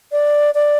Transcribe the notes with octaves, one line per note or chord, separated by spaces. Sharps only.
D5
D5